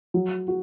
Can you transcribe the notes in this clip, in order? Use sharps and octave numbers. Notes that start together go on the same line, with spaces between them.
F#3
F#4